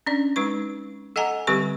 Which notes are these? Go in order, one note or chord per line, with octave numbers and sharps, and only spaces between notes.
C#4 D4 D5
G#3 D#4 B4 C#6
A4 D#5 F#5 G#5 A#5
D3 G3 C4 G4 B4 C#6